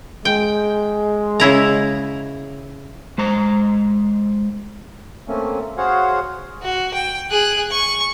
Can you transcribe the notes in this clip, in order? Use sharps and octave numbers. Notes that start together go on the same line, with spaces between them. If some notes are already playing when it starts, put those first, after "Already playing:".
G#3 G5
C#3 E4 A#5
G#3 C5 A#5
A3 A#3 C4 C#4
F#4 G#4 C5 C#5 F5 F#5
F#4
G5
G#4 F#6
C#6